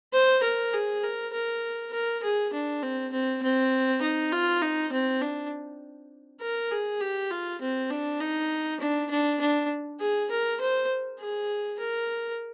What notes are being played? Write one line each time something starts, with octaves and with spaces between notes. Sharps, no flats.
C5
A#4
G#4
A#4
A#4
A#4
G#4
D4
C4
C4
C4
D#4
F4
D#4
C4
D4
A#4
G#4
G4
F4
C4
D4
D#4
D4
D4
D4
G#4
A#4
C5
G#4
A#4